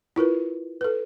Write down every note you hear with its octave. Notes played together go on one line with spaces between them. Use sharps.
E4 F4 A#4 B4
A4 B4